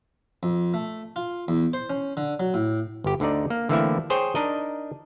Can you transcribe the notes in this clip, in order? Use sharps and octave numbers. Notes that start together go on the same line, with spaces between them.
F2
A3
F4
E2
C5
C#4
D3
F#3
A2
G1 G4
D2 D3 D4 D#4 D5
A#3
D3 E3 A3 A#3 C4 E4
G#4 C5 C#5 G5
D4 D#4 A#4 D#5